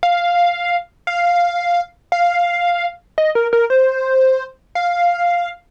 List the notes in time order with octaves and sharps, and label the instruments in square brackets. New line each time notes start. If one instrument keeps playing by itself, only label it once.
[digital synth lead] F5
F5
F5
D#5
A#4
A#4
C5
F5